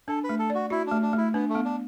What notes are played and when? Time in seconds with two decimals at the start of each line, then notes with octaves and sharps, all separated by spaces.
0.08 D4 A4
0.24 B4
0.29 A3
0.39 A4
0.50 D5
0.55 F#4
0.70 E4 F#4
0.87 A3 D4
1.02 D4
1.13 A3 E4
1.34 B3 D4
1.50 A3
1.55 B3
1.65 D4